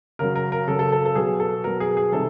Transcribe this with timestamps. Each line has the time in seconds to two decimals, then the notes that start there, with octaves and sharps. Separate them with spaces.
0.19 C#3 F#3 A#4
0.36 A#4
0.52 A#4
0.68 C#3 F#3 A4
0.79 A4
0.92 A4
1.06 A4
1.15 B2 F#3 G#4
1.40 A4
1.64 B2 F#3 A#4
1.80 G#4
1.97 G#4
2.12 C3 D#3 G3 A4